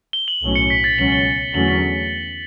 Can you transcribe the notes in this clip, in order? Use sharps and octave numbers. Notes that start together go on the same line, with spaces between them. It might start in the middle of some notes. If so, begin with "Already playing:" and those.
G7
F#7
B1 A2 F#3 C#4
C#7
B6
A6
C#2 B2 F#3 C#4 F#7
G7
E2 D3 F#3 A3 C#4 F#7
B6